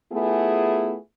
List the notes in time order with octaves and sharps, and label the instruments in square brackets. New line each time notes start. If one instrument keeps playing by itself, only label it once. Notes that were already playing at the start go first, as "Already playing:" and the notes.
[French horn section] A3 B3 E4 F4 G#4